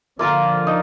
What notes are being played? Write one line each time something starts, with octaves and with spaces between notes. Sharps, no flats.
D3 F3 A#3 F4 A#4 F5
D#4